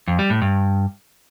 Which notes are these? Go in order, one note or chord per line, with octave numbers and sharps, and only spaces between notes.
F2
G3
A2
G2